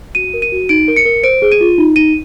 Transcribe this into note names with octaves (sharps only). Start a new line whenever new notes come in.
F#4 D#7
A#4
D#7
F#4
D#4 D7
A#4
C#7
A#4
C5 D7
G#4
D#7
F4
D#4
D#4 D#7